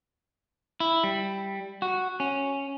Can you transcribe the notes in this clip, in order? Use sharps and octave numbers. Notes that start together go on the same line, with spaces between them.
E4
G3
F#4
C#4